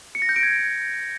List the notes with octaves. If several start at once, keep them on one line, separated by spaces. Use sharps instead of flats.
C#7
A#6
G6
D7
G#6